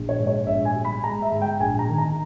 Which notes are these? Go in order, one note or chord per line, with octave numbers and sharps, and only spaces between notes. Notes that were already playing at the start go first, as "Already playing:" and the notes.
Already playing: A#1
C#5
G#2
C#5
A#1 E5
G#5
G3
B5
G#3 A#5
E5
G#2
G5
A#1 G#5
A#5
D#3
A#5